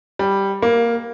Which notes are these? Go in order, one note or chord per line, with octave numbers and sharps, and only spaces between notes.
G3
A#3